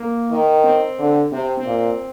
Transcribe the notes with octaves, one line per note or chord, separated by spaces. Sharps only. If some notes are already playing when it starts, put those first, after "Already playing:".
Already playing: A#3
D#3
C4
D3
C3 C4
C4
A#2